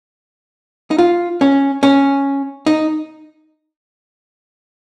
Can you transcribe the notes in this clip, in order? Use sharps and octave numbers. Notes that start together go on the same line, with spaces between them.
D#4
F4
C#4
C#4
D#4